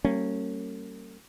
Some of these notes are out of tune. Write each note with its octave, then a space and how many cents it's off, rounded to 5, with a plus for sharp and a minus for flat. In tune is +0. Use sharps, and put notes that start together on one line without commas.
G3 -35 A#3 -45 C#4 -10